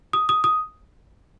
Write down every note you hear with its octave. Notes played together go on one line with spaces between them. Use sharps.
D#6
D#6
D#6